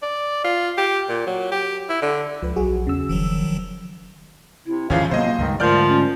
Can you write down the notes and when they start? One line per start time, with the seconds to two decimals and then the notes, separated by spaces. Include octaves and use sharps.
0.03 D5
0.44 F4
0.78 G4
1.09 A#2
1.27 F#3
1.52 G4
1.90 E4
2.02 D3
2.42 C#2 F3 B4
2.56 B1 F#3 F#4 G#4
2.69 A#1
2.87 E2 C#3 E6
3.09 F1 D#3 F3 F#3
4.66 C3 E4
4.90 G#1 D#2 C#3 E3 F3 C#4 F5
5.11 C3 F#3 A#3 B3 C5 D#5
5.38 C#2 G2 D#3 G#3
5.60 G#2 D3 F3 A3 A#4 D5 F6 G6
5.88 C#4